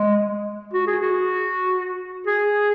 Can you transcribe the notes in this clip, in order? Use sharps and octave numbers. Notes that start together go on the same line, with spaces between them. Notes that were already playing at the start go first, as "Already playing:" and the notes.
Already playing: G#3
F#4
G#4
F#4
G#4